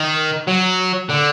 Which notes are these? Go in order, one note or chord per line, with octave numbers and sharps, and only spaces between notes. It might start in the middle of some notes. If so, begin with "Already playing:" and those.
Already playing: D#3
F#3
D3